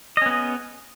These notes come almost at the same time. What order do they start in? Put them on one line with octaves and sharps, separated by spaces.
D#5 C#4 B3 G#4